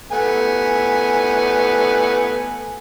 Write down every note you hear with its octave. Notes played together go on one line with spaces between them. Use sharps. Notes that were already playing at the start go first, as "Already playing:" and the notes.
A3 B3 G#5